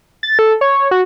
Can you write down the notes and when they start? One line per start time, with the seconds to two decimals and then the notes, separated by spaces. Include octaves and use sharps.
0.23 A6
0.39 A4
0.61 C#5
0.91 F#4